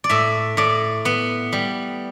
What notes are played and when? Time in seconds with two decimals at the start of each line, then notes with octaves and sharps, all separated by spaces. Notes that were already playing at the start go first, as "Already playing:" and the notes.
0.04 D5
0.09 A2 E5
0.57 A2 D5
1.05 B3
1.53 G3